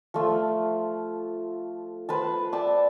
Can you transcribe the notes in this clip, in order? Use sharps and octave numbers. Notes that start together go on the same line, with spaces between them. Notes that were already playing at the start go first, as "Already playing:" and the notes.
F3 A3 F4
B4 C5 A5
D5 E5 G5 A5